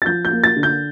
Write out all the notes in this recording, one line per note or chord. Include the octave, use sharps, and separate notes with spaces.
A6
F3 G6
G6
A#3
A6
D3
G6